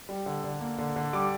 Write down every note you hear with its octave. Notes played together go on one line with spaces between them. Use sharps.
G3
D3
D3
A#3
D3
D3
G3 D6